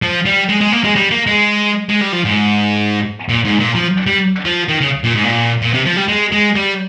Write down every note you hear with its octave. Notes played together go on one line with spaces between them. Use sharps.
F3
G3
G#3
G#3
A#3
G#3
G3
A#3
G#3
G#3
G3
F3
G#2
A#2
G#2
A#2
F3
G3
F3
D#3
C#3
A#2
G#2
A#2
A#2
C3
F3
G3
G#3
G#3
G3